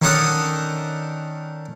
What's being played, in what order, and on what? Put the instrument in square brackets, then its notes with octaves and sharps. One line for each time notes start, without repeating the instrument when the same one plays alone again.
[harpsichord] D#3 C#4 D4 A4 F#5 D#6